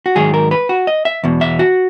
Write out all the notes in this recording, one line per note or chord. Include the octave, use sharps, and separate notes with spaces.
F#4
G#2 D#3 F#3 G#4
A#4
B4
F#4
D#5
E5
E2 B2
E5
F#4